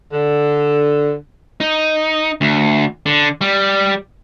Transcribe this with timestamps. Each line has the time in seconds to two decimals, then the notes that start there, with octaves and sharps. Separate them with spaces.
0.12 D3
1.60 D#4
2.41 D2
3.06 D3
3.41 G3